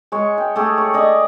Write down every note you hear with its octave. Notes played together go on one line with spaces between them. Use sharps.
G#3 C#5
G5
A3 G4 G#4
C#5
D5 D#5 G#5